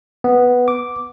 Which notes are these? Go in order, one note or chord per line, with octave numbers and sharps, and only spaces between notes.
B3
D6